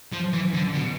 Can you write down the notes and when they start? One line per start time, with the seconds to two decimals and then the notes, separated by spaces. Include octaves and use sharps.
0.13 F3
0.33 E3
0.54 D3
0.74 B2